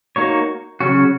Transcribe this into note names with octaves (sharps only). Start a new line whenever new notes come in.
A#3 D#4 F#4 C#5
C#3 F#3 C#4 F#4